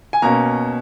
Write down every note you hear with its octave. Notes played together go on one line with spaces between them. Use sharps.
G#5
B2 A#3 C#4 A#5